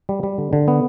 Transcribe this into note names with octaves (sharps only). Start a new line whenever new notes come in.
G3
G3
D3
D3
B3